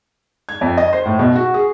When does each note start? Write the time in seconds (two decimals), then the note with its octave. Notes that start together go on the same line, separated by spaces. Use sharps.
0.49 G#6
0.61 F2
0.77 D#5
0.93 C5
1.05 A2
1.19 B2
1.36 F#4
1.54 G#4